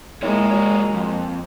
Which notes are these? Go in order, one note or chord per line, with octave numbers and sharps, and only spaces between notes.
G#3 A#3 E4 C#5
F#4 G4 C#5
F2